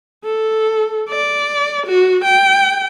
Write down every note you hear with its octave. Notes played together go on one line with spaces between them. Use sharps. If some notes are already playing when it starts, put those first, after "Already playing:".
A4
D5
F#4
G5